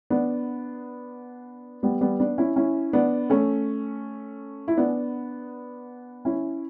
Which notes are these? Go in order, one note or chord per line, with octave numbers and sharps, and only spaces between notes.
B3 D4
G3 B3
G3 B3
B3 D4
C#4 E4
C#4 E4
B3 D4
A3 C#4
E4
B3 D4
C#4 E4